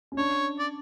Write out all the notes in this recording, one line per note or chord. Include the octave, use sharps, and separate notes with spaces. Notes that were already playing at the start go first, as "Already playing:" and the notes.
C#4
D4 C#5
D5